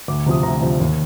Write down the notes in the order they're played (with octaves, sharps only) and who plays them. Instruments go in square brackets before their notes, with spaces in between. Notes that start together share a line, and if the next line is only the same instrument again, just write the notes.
[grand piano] D2 D6
C3 F3 D#6
D2 A#5
C3 F3
D#2